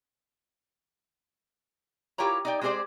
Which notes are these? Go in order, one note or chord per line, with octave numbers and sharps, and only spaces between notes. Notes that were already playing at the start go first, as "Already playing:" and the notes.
E4 F4 G4 A#4 C#5 A#5
D#4 D5 G5
G#3 C4 G4 G#4 C5 D5